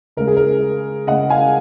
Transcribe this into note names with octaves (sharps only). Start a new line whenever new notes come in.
C#3 G#3 A#4
G#4
A#4
C#3 G#3 D#5 F#5
F5 G#5